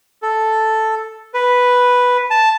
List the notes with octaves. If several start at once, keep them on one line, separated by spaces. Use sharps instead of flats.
A4
B4
A5